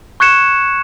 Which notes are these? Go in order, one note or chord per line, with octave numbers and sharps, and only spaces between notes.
C#6 F#6 G#6 C#7 E7